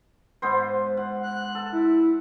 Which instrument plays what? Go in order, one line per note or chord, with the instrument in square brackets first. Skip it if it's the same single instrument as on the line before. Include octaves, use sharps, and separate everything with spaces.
[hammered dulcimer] G#2 B3 C5
F#5
[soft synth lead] F#6
[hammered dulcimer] A4
[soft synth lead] E4